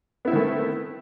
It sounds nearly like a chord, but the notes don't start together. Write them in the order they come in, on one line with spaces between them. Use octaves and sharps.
B3 E4 C4 D#3 A3